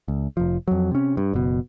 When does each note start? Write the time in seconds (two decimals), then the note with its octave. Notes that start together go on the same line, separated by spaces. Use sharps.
0.08 C#2
0.37 F1 F3
0.68 F2 F#3
0.91 C3 C#4
1.17 G2
1.33 F#1 B2